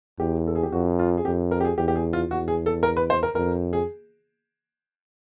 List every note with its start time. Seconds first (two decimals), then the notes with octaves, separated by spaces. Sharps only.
0.19 E2 G4
0.47 A4
0.55 G#4
0.63 G4
0.72 F2 F#4
0.99 F4
1.18 G#4
1.25 F2 G4
1.51 A#4
1.61 G4
1.65 G#4
1.78 E2 G4
1.88 G4
1.96 G#4
2.13 F4
2.30 E2 F#4
2.48 G#4
2.66 A4
2.83 A#4
2.97 B4
3.10 C5
3.23 A#4
3.35 F2 A#4
3.73 G#4